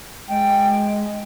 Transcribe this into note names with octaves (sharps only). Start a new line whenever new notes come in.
G#3 G5